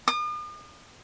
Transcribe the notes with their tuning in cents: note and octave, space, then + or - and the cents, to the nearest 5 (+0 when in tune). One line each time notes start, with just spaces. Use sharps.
D#6 -45